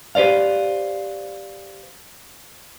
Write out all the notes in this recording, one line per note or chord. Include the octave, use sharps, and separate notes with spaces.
G4 B4 C5 D5 F5